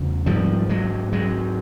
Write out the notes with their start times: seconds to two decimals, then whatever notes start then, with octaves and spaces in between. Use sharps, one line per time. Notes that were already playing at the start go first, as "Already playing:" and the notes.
Already playing: E2 C#3
0.26 G#2 F3 G3
0.69 F#3 G#3
1.13 F#3 G#3